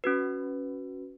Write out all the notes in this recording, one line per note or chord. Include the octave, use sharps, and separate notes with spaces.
C#4 F#4 B4